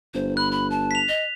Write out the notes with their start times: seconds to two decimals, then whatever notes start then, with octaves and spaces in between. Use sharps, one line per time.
0.14 G1 C5
0.37 B5 F#6
0.51 B5
0.70 A5
0.91 B6 F7
1.09 D#5